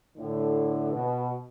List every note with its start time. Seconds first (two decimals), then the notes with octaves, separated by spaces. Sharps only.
0.17 A2 D3
0.92 B2